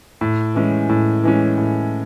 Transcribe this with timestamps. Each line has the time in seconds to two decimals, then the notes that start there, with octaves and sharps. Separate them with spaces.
0.21 A2
0.55 E3 G#3 C#4
0.89 A2
1.24 E3 G#3 C#4
1.58 A2